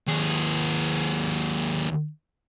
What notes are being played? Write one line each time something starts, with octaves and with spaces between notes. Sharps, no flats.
D#2 G#4